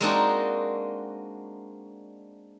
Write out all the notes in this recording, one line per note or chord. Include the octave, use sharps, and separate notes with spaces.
G#3 A#3 C4 D4 D#4 F#4